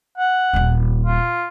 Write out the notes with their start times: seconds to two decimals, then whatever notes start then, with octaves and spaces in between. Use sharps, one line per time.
0.18 F#5
0.53 D#1 C4
1.06 F4